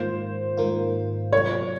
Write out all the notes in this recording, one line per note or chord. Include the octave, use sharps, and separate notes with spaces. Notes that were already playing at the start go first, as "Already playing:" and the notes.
Already playing: G#2 D#3 A#3 F4 C5
G#2 D#3 A#3 F4
C3 F#3 C4 F4 C#5